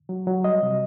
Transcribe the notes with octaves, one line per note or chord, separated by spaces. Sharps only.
F#3
F#3
G3 D#5
C3